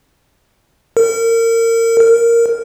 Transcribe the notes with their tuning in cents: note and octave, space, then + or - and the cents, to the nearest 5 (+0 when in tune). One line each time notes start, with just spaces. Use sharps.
A#4 -30
A#4 -5